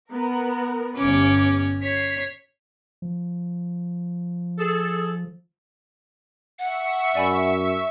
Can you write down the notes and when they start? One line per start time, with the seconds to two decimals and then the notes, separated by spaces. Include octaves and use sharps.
0.11 B3 A#4
0.96 G1 C#4 D6
1.83 C#5 B6 C7
3.02 F3
4.59 G#4 A4
6.59 E5 F#5 C#6
7.15 F#2 D5 G#5 B5